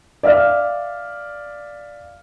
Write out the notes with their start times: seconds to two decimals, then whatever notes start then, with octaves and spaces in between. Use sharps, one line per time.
0.23 D5 E5 F5 F6